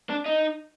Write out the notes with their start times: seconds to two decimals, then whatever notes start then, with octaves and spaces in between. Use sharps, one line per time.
0.09 D4
0.26 D#4